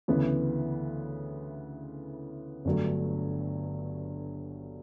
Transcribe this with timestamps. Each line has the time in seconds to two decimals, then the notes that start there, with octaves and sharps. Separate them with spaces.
0.08 D2 C#3 E3 B3
2.65 G1 G2 F#3 A3